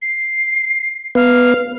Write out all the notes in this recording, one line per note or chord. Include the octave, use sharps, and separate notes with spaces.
C7
B3 F5